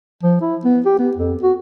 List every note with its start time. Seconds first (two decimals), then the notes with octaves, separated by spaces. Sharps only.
0.23 F3
0.41 E4
0.64 B3
0.86 G4
0.99 B3
1.17 F2
1.43 F#4